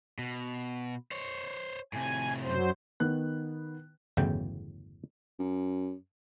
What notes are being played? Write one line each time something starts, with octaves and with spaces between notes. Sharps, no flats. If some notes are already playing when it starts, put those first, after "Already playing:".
B2
C5 C#5
A2 C3 G#5
F#2 F#3 C5
D#3 B3 F#6
G1 E2 A2 C#3 F#3 G5
F#2